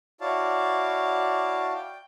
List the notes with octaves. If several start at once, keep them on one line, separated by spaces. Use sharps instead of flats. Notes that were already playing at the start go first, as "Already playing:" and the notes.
E4 F#4 C#5 D5 F5 A5
G5